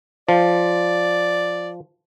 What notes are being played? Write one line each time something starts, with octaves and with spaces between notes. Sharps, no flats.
F3 D5